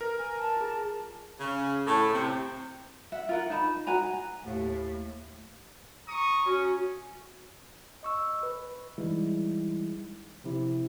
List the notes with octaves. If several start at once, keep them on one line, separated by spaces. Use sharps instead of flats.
A#4 B4 A#6
G#5
A5
F4 G#4
C#3
A2
C3
E5 F#5
F4 A#4 F#5
D#4 A5 B5
F#4 B4 G#5 A#5
D#2 A2
A#5 C#6 D#6
C#4 F#4
D#5 C#6 E6
B4
E3 G3 G#3 D#4 E4
C3 F3 C4 E4 G4